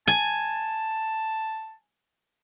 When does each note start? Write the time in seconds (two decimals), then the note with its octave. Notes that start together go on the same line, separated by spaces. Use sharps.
0.08 G#5 A5